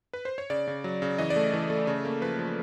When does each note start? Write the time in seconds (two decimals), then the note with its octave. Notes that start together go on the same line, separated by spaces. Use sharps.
0.13 B4
0.25 C5
0.38 C#5
0.50 C#3 D5
0.67 C#3
0.84 F#3
1.02 C#3
1.18 E3 D#5
1.30 D5
1.36 A3
1.53 E3
1.70 A3
1.87 C#3
2.05 A#3
2.22 F3 B4
2.39 F3